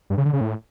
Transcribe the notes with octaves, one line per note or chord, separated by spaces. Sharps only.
G2
C#3
D3
C#3
A2